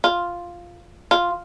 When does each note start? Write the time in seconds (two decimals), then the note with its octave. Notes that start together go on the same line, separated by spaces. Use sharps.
0.04 F4
1.11 F4